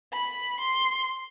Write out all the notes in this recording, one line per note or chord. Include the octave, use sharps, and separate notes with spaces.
B5
C6